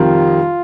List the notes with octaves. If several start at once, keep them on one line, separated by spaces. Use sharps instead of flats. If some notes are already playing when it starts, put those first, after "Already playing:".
Already playing: F2 C3 D#3 G3 F4